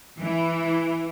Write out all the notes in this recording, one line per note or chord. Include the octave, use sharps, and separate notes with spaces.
E3